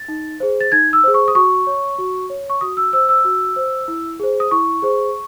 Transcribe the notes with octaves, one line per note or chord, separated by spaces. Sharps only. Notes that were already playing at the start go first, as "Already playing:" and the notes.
Already playing: A6
D#4
G#4 C5
A6
D#4 G#6
E6
G#4 C5
C#6
D#6
F#4 C#6
C#5
F#4
C#5
C#6
F#4 D#6
E6
C5 E6
E6
F#4
C5
E4
G#4 C5
D#6
E4 C#6
G#4 C5